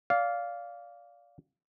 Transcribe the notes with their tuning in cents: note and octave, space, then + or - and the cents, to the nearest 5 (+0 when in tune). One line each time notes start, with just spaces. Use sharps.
D5 -25 F5 +0